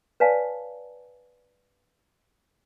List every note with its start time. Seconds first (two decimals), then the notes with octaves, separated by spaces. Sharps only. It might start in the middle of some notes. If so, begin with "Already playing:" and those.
0.20 B4 C#5 D5 F5 G#5 A5